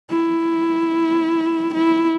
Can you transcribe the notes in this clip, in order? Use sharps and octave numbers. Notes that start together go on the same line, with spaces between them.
E4
E4